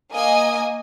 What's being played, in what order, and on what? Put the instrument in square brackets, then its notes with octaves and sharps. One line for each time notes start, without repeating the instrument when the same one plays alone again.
[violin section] A#3 D#5 G#5 D#6